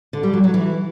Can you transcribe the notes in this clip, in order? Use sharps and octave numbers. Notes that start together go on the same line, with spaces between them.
D3
G3
F#3
F#3
E3